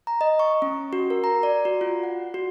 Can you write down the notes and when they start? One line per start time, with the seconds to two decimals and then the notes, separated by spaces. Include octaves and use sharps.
0.07 A#5
0.21 D#5
0.39 C#6
0.62 C#4
0.93 F#4
1.10 A#4
1.24 A#5
1.43 D5
1.65 F#4
1.81 F4
2.03 F#5
2.34 F#4